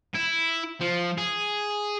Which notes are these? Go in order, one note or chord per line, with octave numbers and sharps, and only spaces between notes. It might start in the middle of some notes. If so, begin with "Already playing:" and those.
E4
F3
G#4